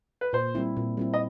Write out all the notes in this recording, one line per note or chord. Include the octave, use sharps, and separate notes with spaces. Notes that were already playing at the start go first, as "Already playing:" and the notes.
B4
A#2 C5
G3 C4 E4
A#2
G3 C4 E4
D#5